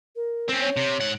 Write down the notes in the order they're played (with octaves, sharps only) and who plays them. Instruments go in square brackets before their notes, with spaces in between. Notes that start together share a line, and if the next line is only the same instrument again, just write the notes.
[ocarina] A#4
[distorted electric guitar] C4 C#4
[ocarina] C#5
[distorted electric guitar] C3
G#2 F#5